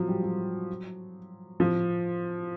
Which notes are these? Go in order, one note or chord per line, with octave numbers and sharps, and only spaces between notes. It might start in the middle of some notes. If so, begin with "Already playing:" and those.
Already playing: F3 F#3
G3
F#3
F3